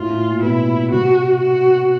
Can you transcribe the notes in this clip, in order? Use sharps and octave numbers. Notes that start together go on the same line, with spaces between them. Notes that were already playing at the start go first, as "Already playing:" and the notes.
Already playing: A2 F4
A2
A#2
B2 E4
C3 F#4
F#4